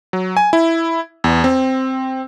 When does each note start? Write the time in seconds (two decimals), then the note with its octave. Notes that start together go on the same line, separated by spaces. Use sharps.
0.13 F#3
0.37 G#5
0.53 E4
1.24 E2
1.44 C4